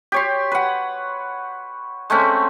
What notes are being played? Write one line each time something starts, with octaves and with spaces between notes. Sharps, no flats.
G4 C#5 C6
B4 F#5
G#3 A3 C4 C#4